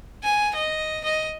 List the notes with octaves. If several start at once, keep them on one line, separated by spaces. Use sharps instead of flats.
G#5
D#5
D#5